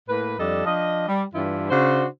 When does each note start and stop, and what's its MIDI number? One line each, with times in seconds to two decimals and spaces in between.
0.09 0.38 45
0.09 0.38 58
0.09 0.38 71
0.39 0.64 41
0.39 0.64 55
0.39 0.64 62
0.39 0.64 69
0.39 0.64 75
0.65 1.05 53
0.65 1.05 62
0.65 1.05 75
1.08 1.24 55
1.34 1.68 43
1.34 1.68 52
1.34 1.68 62
1.34 1.68 64
1.34 1.68 65
1.70 2.06 49
1.70 2.06 62
1.70 2.06 66
1.70 2.06 72